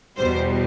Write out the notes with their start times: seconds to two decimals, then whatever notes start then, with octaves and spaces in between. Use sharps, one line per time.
0.17 E2 B2 G3 C5